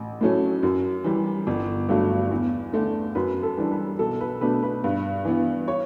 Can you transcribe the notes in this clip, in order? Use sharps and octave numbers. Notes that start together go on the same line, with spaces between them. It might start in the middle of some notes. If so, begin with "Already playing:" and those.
Already playing: A1
A2 F#3 A3 C#4
F#2
E3 G3
G1
G2 F#3 A3
E2
D3 A3 D4
F#2 B4
A4
E3 G3 D4
B4
B1 A4
B4
B2 A3 D4 B4
B4
G2
E3 B3
C#5